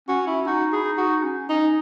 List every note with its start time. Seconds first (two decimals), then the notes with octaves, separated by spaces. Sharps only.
0.08 C#4 F#4
0.27 E4
0.47 D#4 F#4
0.73 E4 G#4
0.85 D#4
0.98 F#4
1.24 C#4
1.49 C#4 D#4